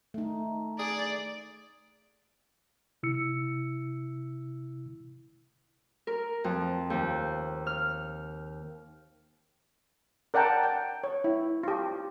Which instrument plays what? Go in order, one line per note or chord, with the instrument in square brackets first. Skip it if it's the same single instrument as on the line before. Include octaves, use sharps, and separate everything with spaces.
[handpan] A3 D#4
[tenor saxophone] G#4 [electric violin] D5
[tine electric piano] C3 E4 E6 C#7
[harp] A#4
F2
D#2
F6
[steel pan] A#4 D5 F#5 G5 A5 A#5
G5
C#5
E4
F4 G4